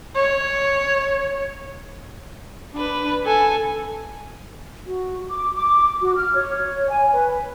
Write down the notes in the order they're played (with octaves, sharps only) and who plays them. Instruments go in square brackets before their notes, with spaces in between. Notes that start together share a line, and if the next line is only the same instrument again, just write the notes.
[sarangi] C#5
[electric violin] D4 B4
A4 G#5
[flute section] F#4
D6
D6
F#4
F6
C#5
G#5
B4